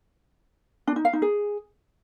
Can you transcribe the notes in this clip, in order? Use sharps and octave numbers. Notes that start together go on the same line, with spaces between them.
D4
D#4
F5
D#4
G#4